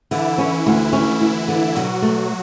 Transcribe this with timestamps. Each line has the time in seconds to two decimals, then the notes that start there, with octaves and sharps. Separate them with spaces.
0.11 D3 E3 E4
0.38 C#4
0.67 D2
0.93 C#4
1.20 D2
1.48 D3
1.75 B2 F#3 F#4
2.02 A3